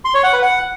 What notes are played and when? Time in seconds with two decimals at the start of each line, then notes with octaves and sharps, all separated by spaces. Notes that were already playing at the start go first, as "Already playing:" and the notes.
0.05 C6
0.14 C#5
0.24 F#5
0.33 B4
0.42 F#5